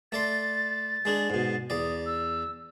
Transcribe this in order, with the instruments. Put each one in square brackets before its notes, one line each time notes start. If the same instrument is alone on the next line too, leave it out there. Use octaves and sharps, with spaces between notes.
[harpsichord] A3 D5 C6 [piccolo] A6
[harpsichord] G#3 D4 G#4
G#2 B2
[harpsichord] E2 D5 [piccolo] D#6
[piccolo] E6